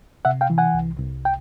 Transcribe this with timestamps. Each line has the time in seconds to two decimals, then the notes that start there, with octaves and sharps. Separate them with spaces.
0.25 C3 E5 F#5
0.41 F5 G5
0.50 E3
0.58 F#5 G#5
0.74 C2
1.00 C2
1.25 G5